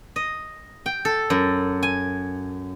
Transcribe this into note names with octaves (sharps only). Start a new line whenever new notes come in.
D#5
G5
A4
F#2
G#5